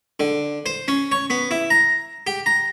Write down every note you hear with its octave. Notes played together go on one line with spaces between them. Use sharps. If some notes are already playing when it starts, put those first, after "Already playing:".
D3
C5
C#4
C#5
B3
E4
A#5
G4
A#5